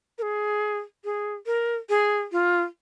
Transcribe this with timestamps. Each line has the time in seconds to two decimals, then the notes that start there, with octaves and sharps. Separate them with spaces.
0.18 A#4
0.22 G#4
1.05 G#4
1.46 A#4
1.89 G#4
2.32 F4